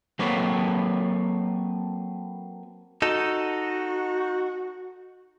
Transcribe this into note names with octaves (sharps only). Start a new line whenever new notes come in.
F#3 A#3 C4 A4 B4 C#5
D#4 F#4 A4